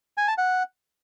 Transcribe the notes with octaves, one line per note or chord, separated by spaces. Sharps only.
G#5
A5
F#5